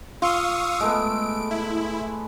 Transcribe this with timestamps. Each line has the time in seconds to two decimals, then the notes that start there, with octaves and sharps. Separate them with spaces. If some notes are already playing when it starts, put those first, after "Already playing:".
0.22 F4 F5 C#6 D#6 E6
0.80 G#3 A3 B3 D7
1.51 E4 B5